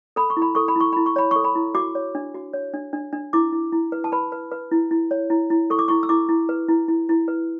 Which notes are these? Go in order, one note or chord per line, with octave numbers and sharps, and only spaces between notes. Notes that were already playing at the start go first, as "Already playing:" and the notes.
A4 B5
C#6
E4
B5
A4 C#6
B5
E4 C#6
E4 B5
C#6
C#5 B5
A4 C#6
B5
E4
F#4 D6
C#5
D4
F#4
C#5
D4
D4
D4
E4 D6
E4
E4
B4
A5
B4 B5
B4
B4
E4
E4
C#5
E4
E4
A4 C#6
D6
E4 C#6
E6
E4 D6
E4
B4
E4
E4
E4
B4